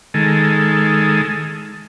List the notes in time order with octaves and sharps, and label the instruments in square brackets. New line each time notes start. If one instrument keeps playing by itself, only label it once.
[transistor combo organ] D#3 G#3 A4